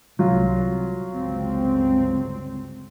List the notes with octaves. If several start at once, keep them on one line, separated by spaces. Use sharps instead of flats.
C2 F#3 F4
G1 C#2 C4